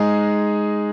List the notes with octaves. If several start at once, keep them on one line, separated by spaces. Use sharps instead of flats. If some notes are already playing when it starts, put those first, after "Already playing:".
Already playing: G#3 D#4 G#4